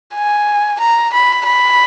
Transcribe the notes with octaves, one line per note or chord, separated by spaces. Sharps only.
G#5
A#5
B5
B5